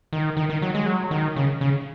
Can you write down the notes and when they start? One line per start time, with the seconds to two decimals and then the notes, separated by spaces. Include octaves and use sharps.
0.13 D#3
0.37 D#3
0.50 D#3
0.62 F#3
0.75 G#3
0.86 F#3
1.11 D#3
1.36 C#3
1.61 C#3